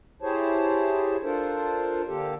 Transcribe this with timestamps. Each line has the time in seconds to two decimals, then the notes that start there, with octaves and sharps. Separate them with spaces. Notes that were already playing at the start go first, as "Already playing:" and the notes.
0.22 E4 G4 G#4 C5 C#5 A5
1.23 D4 F4 A4 A#4 C5
2.08 D3 A#3 G4 A4